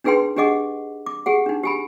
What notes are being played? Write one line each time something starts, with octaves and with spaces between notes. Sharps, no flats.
D4 D#4 G#4 B4 G5 C6
D4 G4 G#4 D#5 F#5 D6
D6
G4 G#4 F#5
D4 D#4
G4 G#5 B5